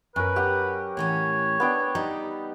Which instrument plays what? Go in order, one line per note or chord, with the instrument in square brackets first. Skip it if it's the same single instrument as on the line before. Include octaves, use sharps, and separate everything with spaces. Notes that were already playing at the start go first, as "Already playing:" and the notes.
[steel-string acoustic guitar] F#2 [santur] C#4 A#4 [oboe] B4
[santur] G4 F#5
[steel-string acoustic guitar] A2 E3 C#4 [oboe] C#5
[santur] B3 D4 G5
[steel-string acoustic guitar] G3 [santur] D#4